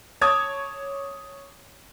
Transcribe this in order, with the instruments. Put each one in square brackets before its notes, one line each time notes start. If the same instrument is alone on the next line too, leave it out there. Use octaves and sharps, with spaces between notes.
[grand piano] C#5 A5 D6 D#6 G#6